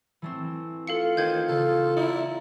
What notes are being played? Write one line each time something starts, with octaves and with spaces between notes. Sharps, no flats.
E3 A3 C4
F4 A4 F5 C#7
D#3 C5 G6 G#6
C#3 A4
E4 D5 A#5